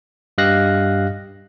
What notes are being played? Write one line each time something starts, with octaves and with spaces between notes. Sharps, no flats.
G2 G4 D#5 F5 F#6 A#6